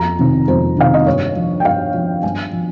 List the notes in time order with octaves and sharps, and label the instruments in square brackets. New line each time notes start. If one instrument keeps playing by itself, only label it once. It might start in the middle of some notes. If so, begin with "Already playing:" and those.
Already playing: [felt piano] F2 A#5
C3 D#3
F2 C5
C3 D#3 F5
D#5
G2 C#5
F3
G5
G2 F5
F3
G2 G#5
F3